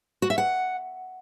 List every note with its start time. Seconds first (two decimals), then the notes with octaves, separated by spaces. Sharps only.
0.22 F#4
0.30 E5
0.38 F#5